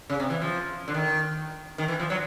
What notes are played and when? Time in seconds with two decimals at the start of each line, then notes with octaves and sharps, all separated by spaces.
0.10 C#3
0.20 C3
0.30 E3
0.42 F3
0.88 D3
0.94 D#3
1.78 D#3
1.88 E3
2.00 F3
2.10 F#3